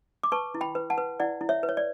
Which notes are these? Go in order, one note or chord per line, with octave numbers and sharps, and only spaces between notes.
D6
B4 A5 C#6
E4
G5 B5
B4
F#5 A5
B4
E4 D5 F#5
E4
C#5 E5
B4
C#5
D5